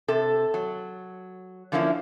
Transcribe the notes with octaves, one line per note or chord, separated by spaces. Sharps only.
C3 A4
F#3
D3 F3 A#3 C#4 E4